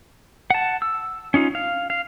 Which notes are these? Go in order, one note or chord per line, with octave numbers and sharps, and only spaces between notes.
F#5 A5
E6
C#4 D#4 F4
F5
F5